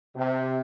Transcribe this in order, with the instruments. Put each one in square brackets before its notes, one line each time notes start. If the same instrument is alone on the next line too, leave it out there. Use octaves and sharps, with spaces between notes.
[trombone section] C3